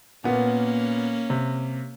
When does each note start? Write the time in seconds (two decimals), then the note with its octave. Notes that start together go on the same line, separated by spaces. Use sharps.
0.24 A#2 A#3 B3 C#4
1.30 C3